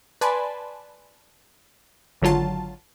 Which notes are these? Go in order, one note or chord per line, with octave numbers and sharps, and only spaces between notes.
B4 D5 G#5 A5 B5 C6
G#1 D3 F#3 F4 A5